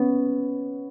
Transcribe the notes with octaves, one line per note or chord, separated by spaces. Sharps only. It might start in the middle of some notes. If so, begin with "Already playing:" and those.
Already playing: B3 C#4